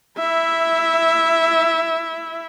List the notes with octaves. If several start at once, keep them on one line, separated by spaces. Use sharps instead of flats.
E4 E5